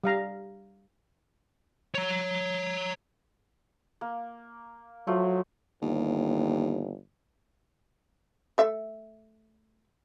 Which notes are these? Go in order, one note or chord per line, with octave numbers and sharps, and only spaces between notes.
G3 F5 A#5
C#5 A#5
A#3
F3 F#3 A3
G1 D#2
A3 E5